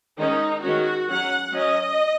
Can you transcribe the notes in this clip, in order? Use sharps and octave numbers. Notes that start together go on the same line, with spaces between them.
D#3 G#3 C#4 D#4
D#3 G#3 C#4 F#4
F#3 C#4 F#5
F#3 C#4 D#5